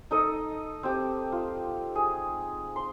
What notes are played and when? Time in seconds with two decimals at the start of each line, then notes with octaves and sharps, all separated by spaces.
0.11 D#4 A4 D#5
0.83 C4 G4
1.32 F4
1.95 G#4
2.76 C6